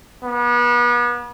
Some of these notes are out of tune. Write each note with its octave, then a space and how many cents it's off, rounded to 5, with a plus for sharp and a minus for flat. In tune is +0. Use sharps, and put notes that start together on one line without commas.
B3 -35